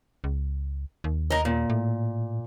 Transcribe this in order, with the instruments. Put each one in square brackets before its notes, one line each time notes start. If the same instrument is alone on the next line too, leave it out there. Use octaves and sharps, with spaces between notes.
[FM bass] C#2
D#2
[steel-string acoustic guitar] A#4 D#5
A#2
[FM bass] A2